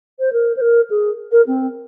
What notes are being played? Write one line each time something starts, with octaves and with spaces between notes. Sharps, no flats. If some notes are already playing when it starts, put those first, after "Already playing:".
C5
A#4
C5
A#4
G#4
A#4
C4